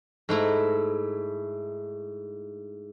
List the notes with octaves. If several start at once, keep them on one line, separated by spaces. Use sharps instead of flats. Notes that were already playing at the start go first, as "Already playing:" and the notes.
G#2 A3 E4 A#5